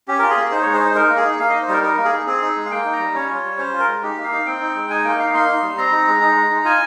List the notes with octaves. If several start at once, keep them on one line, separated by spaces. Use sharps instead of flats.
C#4 G4
F4 A#4
G#4
A#3
D#4 C5
G#3 C#5
C5
D#4
D#4 A#4
A#3
G#4
D#4
A#3 F5
D#4 D#5
C5
G3 A#4
D#4 A#4
A#3
G#4
D#4
C4 G#4
D#4
G#3
F5
A#3 G5
D#4
A#5
G3
C#4 C#5
F4
G3
C#4 C5
F4
A#4
G#3
D#4 G4
A#3
F5
D#4
C4 G5
D#4
G#3
D#4 G#5
A#3 G5
D#4 F5
A#3 C6
D#4
G3
C4 A#5
D#4
G#3
D#4
G#3
D#4
F4 G#5